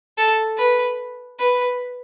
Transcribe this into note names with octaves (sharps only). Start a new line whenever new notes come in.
A4
B4
B4